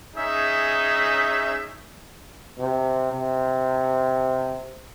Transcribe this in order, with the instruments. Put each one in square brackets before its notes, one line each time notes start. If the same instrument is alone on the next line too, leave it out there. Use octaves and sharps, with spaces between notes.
[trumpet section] C#4 D#4 G#4 E5
[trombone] C3
C3